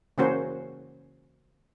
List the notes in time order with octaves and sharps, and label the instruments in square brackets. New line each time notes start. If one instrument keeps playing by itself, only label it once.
[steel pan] C#3 E3 A#3 C#4 F#4 C5